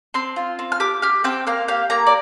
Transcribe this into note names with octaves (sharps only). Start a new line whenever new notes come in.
C4 C6
F4
C4
F6
G4 D6
G4 F6
C4 G5
A#3 F5
G4 F5
A#3 A#5
D5